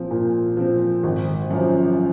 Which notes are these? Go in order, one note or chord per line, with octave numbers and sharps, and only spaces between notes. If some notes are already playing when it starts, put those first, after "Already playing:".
Already playing: A#2 F3 C4
A#2
F3 C4
G#1
F#2 F3